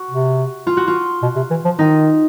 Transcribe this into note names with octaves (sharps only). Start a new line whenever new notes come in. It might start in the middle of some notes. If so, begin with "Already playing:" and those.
Already playing: F#4
C3
F4
F#4
F4
B2
C3
E3
F3
D#3 D#4